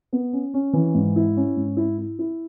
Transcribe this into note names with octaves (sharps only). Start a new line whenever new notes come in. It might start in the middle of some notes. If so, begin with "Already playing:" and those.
B3
C#4
C#4
E3
G#2
E4
C#4
G#2
E4
E4
E4